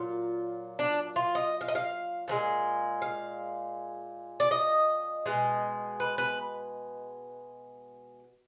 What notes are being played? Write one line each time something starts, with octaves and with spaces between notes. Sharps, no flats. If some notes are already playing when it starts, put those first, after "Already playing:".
Already playing: A#2 F#3 F4
D4
F4
D#5
F5
D#5
F5
A#2 F3 G#3
F5
D5
D#5
B2 G#3
B4
B4